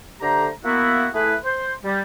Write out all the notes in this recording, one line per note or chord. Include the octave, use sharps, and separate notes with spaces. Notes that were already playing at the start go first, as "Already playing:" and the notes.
D3 A3 G4 C5 A#5
A#3 B3 E4 F#4
A3 E4 G#4 B4
C5
G3